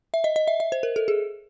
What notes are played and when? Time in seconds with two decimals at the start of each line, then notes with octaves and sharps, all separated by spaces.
0.14 E5
0.24 D#5
0.36 D#5
0.48 E5
0.60 E5
0.72 C5
0.83 A#4
0.96 A4
1.08 G#4